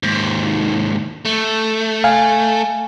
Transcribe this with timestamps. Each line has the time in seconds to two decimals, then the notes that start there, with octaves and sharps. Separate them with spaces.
0.03 D#2 G#2
1.25 A3
2.04 F5 G#5